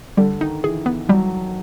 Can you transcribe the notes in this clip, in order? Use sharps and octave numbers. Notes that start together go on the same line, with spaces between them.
D3 G3
D#3 D#4
E3 G#4
B3
F#3 G3